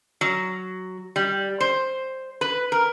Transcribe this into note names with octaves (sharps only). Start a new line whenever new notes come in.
F#3
G3
C5
B4
A#4